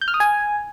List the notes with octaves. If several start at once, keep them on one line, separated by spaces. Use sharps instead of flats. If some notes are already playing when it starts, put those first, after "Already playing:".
G6
F6
D#6
G#5